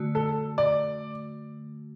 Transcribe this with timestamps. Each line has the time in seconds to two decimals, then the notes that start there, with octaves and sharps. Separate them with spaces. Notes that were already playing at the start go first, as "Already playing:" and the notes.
Already playing: D3 A3 F#4
0.15 A4
0.58 D5